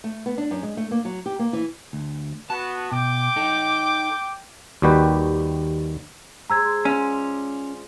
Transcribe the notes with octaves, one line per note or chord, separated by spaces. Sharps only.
A3
B3
D4
F#2
G#3
A3
A#3
F#3
G4
A#3
E3
D2
B3 F#4 A5
B2 G5 D6
D#4 A4
D#2 D#3 G3 F#4 G4 B4
G#3 G#4 C5 A#5 E6 G#6
C#4 F4 D5